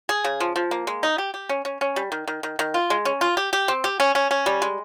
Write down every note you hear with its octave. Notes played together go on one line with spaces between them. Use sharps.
G#4
C#3
F3
F3
A#3
G#3
D#4
G4
G4
C#4
C#4
C#4
G3
D#3
D#3
D#3
D#3
F4
G#3
C#4
F4
G4
G4
C4
G4
C#4
C#4
C#4
G3
G#3